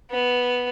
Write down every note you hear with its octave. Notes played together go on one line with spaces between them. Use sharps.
B3